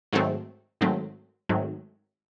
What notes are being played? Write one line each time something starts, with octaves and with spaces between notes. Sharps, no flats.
G#2 D#3 F#3 A3 C4
G#2 D#3 F#3 A3 C4
G#2 D#3 F#3 A3 C4